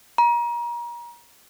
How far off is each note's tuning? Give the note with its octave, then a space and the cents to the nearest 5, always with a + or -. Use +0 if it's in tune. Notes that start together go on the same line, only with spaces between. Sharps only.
A#5 +30